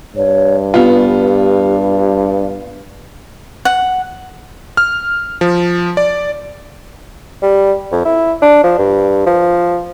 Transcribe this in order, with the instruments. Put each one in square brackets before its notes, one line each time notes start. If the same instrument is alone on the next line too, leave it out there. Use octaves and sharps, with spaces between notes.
[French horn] G2 [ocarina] C#5
[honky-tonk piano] B3 F4 [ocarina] G4
[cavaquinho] F#5
[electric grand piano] F6
F3
D5
[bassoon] G3
F2
E4
D4
F3
G2
F3